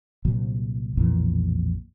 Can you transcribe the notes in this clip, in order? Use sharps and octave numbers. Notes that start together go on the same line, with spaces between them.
C2 A#2 F#3
B1 F2 A#2 E3